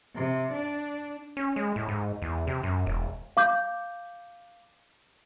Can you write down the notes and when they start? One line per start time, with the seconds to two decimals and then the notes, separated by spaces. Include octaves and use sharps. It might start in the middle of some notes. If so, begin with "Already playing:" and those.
0.15 C3
0.52 D4
1.37 C#4
1.56 G#3
1.76 A2
1.88 G#2
2.22 E2
2.47 C3
2.63 F#2
2.86 E1
3.37 F5 D6 G6